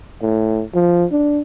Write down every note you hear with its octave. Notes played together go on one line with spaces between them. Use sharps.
A2
F3
D4